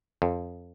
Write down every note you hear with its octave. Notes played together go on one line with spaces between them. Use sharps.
F2